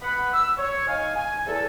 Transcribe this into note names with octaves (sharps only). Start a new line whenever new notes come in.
B3 F#5 B5
E6
C#5
D#4 F5 G#5
G#5
E2 A4